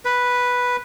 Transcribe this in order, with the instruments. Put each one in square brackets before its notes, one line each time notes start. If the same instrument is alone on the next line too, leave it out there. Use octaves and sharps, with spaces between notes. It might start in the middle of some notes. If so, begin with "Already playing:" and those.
[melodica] B4